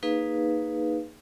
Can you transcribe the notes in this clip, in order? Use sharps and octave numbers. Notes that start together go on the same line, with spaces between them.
A#3 D#4 G#4 B4 F5